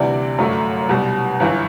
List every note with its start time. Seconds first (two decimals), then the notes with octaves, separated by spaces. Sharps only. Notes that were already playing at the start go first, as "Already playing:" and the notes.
Already playing: D2 C3 E3 G3 D5
0.38 G1 F#2 F#3 A3
0.89 C2 B2 G3
1.40 G1 F#2 E3